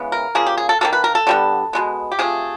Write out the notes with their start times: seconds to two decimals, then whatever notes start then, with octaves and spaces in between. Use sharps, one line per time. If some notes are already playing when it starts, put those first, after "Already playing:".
Already playing: C#3 E3 G#3 B3
0.12 A#4
0.35 C#3 F3 A#3 G#4
0.46 G4
0.58 G#4
0.69 A4
0.81 D#3 G3 A#3 A4
0.93 B4
1.04 A#4
1.15 A4
1.27 D3 G3 B3
1.73 B2 G#3 B3
2.12 G4
2.19 C3 F3 A3 G#4